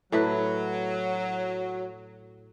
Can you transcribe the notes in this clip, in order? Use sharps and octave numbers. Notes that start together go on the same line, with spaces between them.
A2 F#3 E4 B4